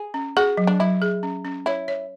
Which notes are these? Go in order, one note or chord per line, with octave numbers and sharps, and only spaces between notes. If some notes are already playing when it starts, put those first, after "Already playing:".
Already playing: G#4
C#4
F#4 G#4
F#3
D4
F#3 E4
G#4
C#4
C#4
E4 C#5
C#5